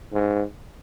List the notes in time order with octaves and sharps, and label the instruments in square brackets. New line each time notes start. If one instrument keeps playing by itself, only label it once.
[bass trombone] G#2